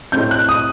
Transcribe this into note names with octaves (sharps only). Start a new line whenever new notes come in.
A2 A3 C4 G6
F#6
D#6